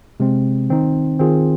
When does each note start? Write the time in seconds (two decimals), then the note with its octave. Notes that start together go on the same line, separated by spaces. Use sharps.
0.20 C3 G#3 C4
0.70 D#3 C4 D#4
1.19 D#3 C4 F4 G#4